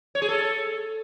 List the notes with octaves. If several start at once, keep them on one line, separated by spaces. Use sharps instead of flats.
C#5
G#4
A4